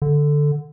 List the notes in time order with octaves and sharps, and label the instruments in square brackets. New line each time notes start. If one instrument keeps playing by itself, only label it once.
[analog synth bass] D3